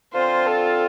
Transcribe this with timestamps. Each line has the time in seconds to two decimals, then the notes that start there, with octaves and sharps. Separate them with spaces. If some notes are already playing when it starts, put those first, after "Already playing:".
0.13 D3 F3 C4 F4 C5
0.47 A4